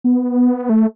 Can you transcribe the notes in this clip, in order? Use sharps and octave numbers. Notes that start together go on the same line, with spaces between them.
B3
A3